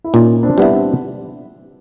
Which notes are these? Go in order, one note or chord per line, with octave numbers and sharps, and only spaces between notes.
E4
A#2 C#4 D#4
C4 D4
G3 B3 E4
C4 D4